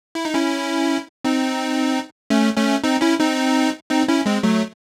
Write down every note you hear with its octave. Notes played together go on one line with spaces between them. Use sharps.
E4
D#4
C#4 E4
C4 D#4
A3 C#4
A3 C#4
C4 D#4
C#4 E4
C4 D#4
C4 D#4
C#4 E4
G#3 C4
F#3 A3